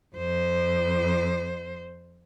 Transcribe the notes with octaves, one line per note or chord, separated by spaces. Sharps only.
F2 C5